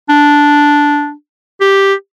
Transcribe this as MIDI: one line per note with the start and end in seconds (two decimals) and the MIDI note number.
0.09 1.13 62
1.61 1.94 67